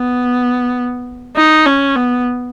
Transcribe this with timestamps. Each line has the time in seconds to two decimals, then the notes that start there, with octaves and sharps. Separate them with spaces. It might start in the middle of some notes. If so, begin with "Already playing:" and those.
Already playing: B3
1.36 D#4
1.66 C#4
1.96 B3